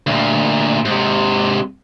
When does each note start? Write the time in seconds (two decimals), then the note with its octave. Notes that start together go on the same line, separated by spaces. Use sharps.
0.07 D2 A#2
0.85 G#2 C3